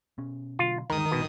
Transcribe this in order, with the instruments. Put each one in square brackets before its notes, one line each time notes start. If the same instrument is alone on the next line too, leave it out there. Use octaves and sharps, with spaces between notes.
[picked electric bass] B2 C#4
[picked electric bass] B2 D3 F#3 [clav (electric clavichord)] F4
[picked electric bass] D2 G2 G#3 [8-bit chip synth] D#3 D#6 [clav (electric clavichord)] A#4
[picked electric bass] A#1 G2 [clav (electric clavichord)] B2